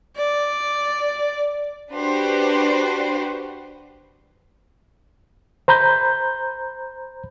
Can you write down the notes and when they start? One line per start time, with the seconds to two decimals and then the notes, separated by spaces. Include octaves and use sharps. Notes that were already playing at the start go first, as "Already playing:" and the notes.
0.17 D5
1.92 D4 F#4 G4 B4 C5
5.68 C5 A#5 B5 G6